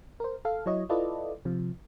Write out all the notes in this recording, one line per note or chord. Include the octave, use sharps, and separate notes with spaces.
A#4 C5
A4 F5
F#3 E4 C#5 D#5
E4 F4 A4 B4 D5 D#5
C3 F3